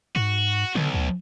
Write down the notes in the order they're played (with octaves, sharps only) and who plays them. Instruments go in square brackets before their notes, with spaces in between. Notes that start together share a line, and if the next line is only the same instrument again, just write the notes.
[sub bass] G#2 [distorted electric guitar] F#4
[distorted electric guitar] B1 [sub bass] D3
[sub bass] D2